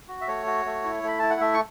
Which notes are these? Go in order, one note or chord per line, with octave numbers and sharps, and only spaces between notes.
F#4
E5
A3 C#5
F#4
A3
E4
A3 B5
E4 A5
F#5
A3 E5
C#6